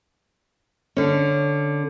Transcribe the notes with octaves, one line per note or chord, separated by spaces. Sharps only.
D3 C#4